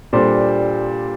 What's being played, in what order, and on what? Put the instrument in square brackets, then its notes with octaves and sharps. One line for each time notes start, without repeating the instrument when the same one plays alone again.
[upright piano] A#2 G3 D4 A4 C5